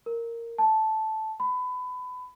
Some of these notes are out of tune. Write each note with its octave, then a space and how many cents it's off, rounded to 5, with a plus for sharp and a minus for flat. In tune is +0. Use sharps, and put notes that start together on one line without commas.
A#4 -10
A5 -10
B5 +25